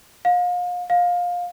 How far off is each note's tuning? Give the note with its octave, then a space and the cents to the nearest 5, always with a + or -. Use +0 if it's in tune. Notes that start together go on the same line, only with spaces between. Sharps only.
F5 +35
F5 +20